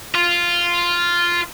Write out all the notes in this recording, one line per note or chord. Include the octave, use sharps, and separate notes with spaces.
F4